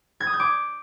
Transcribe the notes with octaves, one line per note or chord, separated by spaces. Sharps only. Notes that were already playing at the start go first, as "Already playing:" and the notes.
G#6
D#6
G6
D6